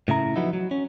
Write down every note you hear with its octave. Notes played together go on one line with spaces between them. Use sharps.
A2 C#3 E4 A#5
F3 F#3 B3 D#4 E4
F#3
C#4